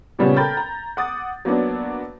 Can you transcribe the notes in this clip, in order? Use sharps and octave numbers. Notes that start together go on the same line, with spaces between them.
A#2 C#3 G3 B3 C#4
A4 A#4 G5 B5 G6 A6
A#5
F#5 D6 D#6 A6
F#3 A#3 B3 D4